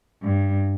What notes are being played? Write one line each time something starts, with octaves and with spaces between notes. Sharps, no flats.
G2